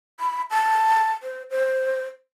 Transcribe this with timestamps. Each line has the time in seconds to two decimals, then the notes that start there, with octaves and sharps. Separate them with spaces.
0.20 B5
0.51 A5
1.23 C5
1.51 C5